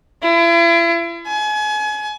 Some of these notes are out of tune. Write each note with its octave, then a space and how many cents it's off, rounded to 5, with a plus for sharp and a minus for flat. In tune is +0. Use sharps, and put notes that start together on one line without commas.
E4 +40
G#5 +30